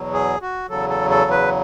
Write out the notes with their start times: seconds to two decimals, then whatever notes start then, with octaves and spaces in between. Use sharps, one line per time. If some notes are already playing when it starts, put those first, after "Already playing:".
Already playing: E2 B2 F#3
0.13 G#4
0.42 F#4
0.69 E2 C#3 F#3 A4
0.89 A4
1.10 A4
1.31 B4